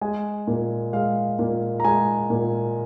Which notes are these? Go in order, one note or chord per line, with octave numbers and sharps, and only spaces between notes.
G#3 G#5
A#2
G#3 F5
A#2
A#5
G#3 G#5
A#2